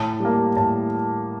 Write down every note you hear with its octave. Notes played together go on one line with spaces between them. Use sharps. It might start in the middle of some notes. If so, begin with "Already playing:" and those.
Already playing: A2 A5
G3 A#3
A2 A5